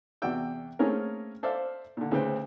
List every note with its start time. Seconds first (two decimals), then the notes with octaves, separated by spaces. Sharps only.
0.22 E2 C3 F#4 D5 G5 E6
0.79 A3 A#3 C4 C#4 G#4 A#4
1.43 A4 C5 D5 E5 F5
1.97 A#2 D3
2.11 D2 C#3 B4 C5 G5